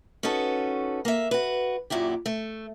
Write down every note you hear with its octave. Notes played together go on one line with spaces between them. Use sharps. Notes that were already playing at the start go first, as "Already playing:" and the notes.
C#4 D#4 F#4 A4 B4
A#3 E5
F#4 B4
F#2 A#2 F#3 E4 G4
A3